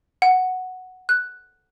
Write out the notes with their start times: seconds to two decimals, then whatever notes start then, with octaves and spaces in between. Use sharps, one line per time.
0.22 F#5
1.09 F#6